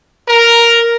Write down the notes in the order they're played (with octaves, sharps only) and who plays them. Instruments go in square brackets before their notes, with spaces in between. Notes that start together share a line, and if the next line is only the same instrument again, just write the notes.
[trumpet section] A#4